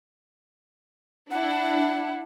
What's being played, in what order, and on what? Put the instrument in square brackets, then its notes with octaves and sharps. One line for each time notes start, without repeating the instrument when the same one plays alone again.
[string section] D4 E4 [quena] F#5